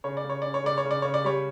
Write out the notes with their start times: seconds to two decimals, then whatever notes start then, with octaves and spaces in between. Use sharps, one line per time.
0.04 C#3 C#5
0.17 D5
0.24 C#3
0.29 C#5
0.42 C#4 D5
0.54 C#5
0.64 C#3 D5
0.78 C#5
0.85 C#3
0.91 D5
1.02 C#3 C#5
1.14 D5
1.24 G3 C#5